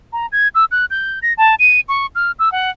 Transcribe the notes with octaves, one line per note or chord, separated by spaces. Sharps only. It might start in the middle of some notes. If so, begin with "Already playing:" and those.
A#5
G#6
E6
F#6
G6
A#6
A5
D#7
C#6
F6
E6
F#5